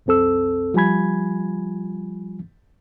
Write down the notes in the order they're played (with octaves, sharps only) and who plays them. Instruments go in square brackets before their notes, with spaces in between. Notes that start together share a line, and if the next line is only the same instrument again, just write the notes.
[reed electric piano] C2 F#2 C4 A4 E6
F3 G3 F4 G#5 B5 G#6